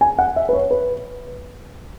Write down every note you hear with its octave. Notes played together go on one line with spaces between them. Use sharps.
G#5
F#5
E5
B4
C#5
B4